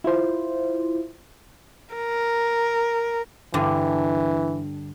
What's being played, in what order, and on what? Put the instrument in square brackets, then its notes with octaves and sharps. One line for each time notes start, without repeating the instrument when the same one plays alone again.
[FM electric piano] E4 F4 C5
[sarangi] A#4
[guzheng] G2 D3 [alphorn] E3